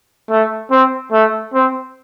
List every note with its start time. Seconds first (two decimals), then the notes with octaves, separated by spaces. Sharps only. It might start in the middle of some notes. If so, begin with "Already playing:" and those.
0.30 A3
0.71 C4
1.12 A3
1.54 C4